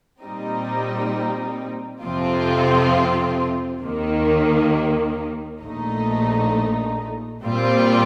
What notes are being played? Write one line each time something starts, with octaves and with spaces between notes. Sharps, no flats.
A#2 G3 C4 D#4
F2 C3 F3 C4 F4
D#2 D#3 A#3
A#1 A#2 A3 D#4
A#2 G3 C4 F4